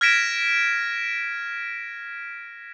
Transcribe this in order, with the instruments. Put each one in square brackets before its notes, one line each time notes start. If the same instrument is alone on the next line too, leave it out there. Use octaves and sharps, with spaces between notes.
[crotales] F6 G#6 A#6 B6 D7 E7